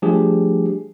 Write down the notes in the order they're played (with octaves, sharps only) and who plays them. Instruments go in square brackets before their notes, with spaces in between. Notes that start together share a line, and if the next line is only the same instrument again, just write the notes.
[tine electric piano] F3 G3 A3 D4 G4 G#4